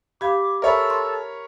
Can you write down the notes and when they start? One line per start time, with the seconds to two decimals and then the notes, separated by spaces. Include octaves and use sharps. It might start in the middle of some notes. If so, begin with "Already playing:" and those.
0.21 G4 F5 B5 D6 G#6
0.62 A4 A#4 C#5 E5 B5
0.90 C6